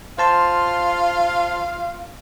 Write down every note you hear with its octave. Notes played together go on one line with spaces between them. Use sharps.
F4 C5 F5 A5 C6